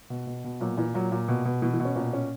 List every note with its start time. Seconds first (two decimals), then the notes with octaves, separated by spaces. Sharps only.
0.10 B2
0.27 B2
0.44 B2
0.61 A#2 F#3
0.77 A#2 E3
0.94 A#2 F#3
1.12 A#2
1.28 B2
1.45 B2
1.62 B2 E3
1.73 E3
1.80 B2
1.85 C#4
1.96 A#2 C#4
2.13 A#2 C#4